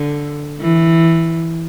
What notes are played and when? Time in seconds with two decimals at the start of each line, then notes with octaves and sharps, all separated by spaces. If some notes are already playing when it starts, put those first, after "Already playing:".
Already playing: D3
0.60 E3